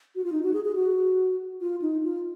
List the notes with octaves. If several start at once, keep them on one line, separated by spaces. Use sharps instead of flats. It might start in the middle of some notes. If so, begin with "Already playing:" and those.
F#4
F4
D#4
F#4
G#4
G#4
F#4
F4
D#4
F4